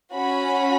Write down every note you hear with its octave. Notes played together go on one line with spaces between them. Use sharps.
C#4 F#4 B5